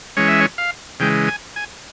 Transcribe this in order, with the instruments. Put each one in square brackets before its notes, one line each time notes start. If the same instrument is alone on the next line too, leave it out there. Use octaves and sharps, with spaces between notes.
[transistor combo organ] E3 G#3 C#4 C#5
E5
C#5
F5
C#3 E3 G#3 G5
G#5
G#5